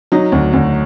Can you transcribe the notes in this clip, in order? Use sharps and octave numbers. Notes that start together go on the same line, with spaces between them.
F#3 D#4
D2
D2